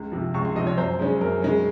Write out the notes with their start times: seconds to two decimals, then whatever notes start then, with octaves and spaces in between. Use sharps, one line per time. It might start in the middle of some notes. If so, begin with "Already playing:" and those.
Already playing: C#2
0.12 C3 F3
0.34 C#2 C#6
0.45 C6
0.55 C3 F3 D#5
0.67 C#5
0.78 F#2 C5
0.99 C#3 G#3 C#4
1.21 F#2 A#4
1.42 C#3 G#3 C#4